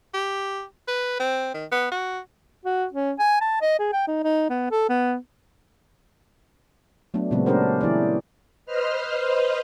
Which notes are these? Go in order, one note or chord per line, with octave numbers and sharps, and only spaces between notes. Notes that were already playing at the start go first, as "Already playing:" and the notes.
G4
B4
C4
D#3
B3
F#4
F#4
C#4
G#5
A5
D#5
G#4
G5
D#4
D#4
B3
A4
B3
F#3 A3 B3 D4
A#2 C#3 F#3 G#3 B3 C4
A3 C#4 D4 G4 A#4 C5
E3 E4 G#4 D5
B4 C5 D#5 F6